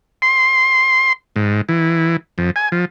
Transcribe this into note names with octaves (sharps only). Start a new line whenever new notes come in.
C6
G#2
E3
F2
G#5
F3